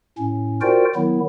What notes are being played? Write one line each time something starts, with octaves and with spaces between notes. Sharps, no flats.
A2 C#4
F4 F#4 A#4 C5 D5 G5
D#3 F#3 B3 E4